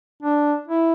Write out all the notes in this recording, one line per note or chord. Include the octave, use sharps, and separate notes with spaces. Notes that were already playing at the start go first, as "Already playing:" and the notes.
D4
E4